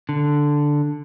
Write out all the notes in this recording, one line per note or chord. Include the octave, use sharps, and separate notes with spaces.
D3